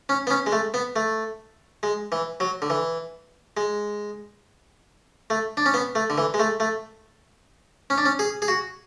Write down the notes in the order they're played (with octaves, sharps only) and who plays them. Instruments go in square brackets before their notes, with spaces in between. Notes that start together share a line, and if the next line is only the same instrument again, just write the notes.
[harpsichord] C#4
B3
C#4
G#3
A3
B3
A3
G#3
E3
F#3
D3
E3
G#3
A3
D4
C#4
B3
A3
D3
E3
G#3
A3
A3
C#4
D4
C#4
G#4
G#4
F#4